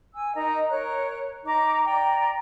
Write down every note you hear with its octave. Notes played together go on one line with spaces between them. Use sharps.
G#5 E6
D#4 A#4 D#5 A#5
A#4 C#5 F#6
D#4 A#5 D6
D5 G5 A#5